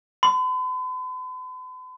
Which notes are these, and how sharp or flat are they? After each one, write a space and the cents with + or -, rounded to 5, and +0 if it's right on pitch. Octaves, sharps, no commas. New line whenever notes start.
B5 +45